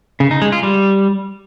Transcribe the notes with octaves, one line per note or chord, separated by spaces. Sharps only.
C#3
D#4
G#3
F4
G3